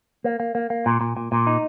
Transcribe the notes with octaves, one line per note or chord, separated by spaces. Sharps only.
A#3
A#3
A#3
A#3
A#2
A#2
A#2
A#2
D#4